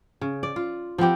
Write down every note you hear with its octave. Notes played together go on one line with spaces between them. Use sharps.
C#3
D5
F4
F3 B3 C4 G4